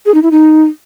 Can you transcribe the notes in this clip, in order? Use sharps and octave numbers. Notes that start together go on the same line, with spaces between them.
G#4
D#4
E4
D#4